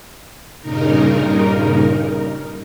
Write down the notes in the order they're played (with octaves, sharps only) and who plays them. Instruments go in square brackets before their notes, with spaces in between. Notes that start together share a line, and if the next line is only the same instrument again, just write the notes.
[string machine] G2 A#2 C#3 D#4 A#4